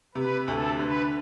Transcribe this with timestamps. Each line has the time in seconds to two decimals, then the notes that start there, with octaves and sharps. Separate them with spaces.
0.15 C3 B4
0.48 D2 A4
0.79 D3 B4